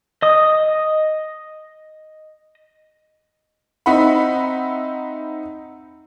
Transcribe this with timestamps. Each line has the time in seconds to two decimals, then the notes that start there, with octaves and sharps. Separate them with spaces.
0.22 D#5 D#6
3.86 C4 D#4 E5 F#5 B5